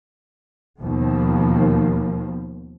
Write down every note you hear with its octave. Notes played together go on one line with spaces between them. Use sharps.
D#2 B2 D#3 F3